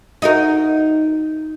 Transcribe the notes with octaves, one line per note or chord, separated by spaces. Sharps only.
D#4 F#4 A#4